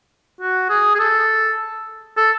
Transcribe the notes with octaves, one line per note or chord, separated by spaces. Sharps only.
F#4
G#4
G#4
A4
A4